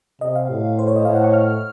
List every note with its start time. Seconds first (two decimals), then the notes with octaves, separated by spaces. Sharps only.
0.21 C3 D#5
0.35 F5
0.50 A2
0.79 C5
0.88 C#5
0.96 D#5
1.05 A2 F5
1.15 F#5
1.24 C#6
1.34 F6